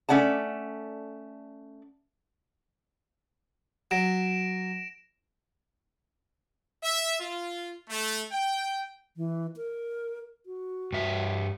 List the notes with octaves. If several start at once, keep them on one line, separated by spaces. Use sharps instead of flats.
A3 C#4 D5 F#5 A5
F#3 A#6 D7 E7
E5
F4
A3
G5
E3
A#4
F#4
G2 E5